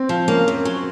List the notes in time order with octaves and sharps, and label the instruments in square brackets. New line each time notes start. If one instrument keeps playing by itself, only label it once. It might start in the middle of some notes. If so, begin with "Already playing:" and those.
Already playing: [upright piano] C4
[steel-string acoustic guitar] F3
[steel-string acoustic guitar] A#3 [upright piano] C#4
[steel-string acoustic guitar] F#2
F#3